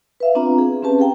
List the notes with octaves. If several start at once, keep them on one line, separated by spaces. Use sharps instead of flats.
B4 E5 F5
B3 C4 D4 F4 A#5
G#4
C4 C#4 G4 B4 A5
G#4 F5 G5 A#5